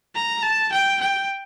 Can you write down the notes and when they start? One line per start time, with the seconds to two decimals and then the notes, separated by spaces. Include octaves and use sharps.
0.15 A#5
0.43 A5
0.72 G5
1.01 G5